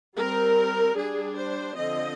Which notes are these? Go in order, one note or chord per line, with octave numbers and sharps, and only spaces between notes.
G3 C4 A#4
G3 D4 G#4
C5
D3 F3 C4 D#5